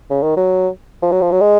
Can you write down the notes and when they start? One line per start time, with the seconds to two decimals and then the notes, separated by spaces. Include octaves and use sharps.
0.10 C#3
0.23 D#3
0.37 F#3
1.03 F3
1.12 F#3
1.22 F3
1.32 F#3
1.41 G#3